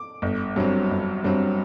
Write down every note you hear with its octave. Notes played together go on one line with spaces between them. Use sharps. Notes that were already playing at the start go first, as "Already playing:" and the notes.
Already playing: D6
G1
G2 F#3 C4
G1
G2 F#3 C4